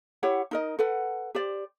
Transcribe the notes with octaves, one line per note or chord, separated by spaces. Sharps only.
E4 G4 C#5 F#5
D#4 A#4 D#5
A4 B4 F#5
G4 C5 D5